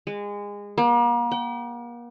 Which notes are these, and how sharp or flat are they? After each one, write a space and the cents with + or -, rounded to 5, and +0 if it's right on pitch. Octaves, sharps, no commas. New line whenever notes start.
G#3 -25
A#3 +40
G5 -40